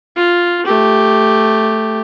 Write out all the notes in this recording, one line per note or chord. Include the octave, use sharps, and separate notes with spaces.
F4
A3 G4